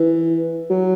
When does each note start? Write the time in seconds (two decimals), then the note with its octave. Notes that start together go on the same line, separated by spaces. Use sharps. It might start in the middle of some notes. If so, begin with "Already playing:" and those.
Already playing: E3
0.70 F#3